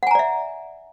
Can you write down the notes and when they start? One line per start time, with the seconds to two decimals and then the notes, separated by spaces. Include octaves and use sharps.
0.03 F#5
0.07 G#5
0.11 A#5
0.15 D5
0.19 E5